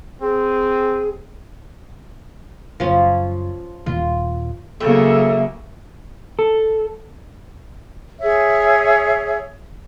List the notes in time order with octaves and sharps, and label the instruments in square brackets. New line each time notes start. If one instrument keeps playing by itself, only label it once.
[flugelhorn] C4 [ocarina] G#4
[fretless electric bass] F#1 [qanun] F3 C#4
[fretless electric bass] D#1 [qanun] F4
[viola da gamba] C#3 F#3 A#3 [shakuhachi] A4 [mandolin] E5
[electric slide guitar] A4
[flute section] G#4 C#5 E5